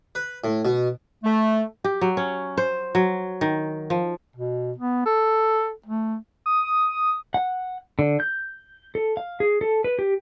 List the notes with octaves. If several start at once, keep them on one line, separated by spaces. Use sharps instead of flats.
B4
A2
B2
A3
G4
F#3
C#4
C5
F#3
D#3
F3
B2
B3
A4
A3
D#6
F#5
D3
G6
A4
F5
G#4
A4
B4
G4